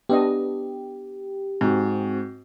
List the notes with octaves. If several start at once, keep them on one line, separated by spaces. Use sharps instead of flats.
B3 D4 G4 D#5
G#2 C4 F#4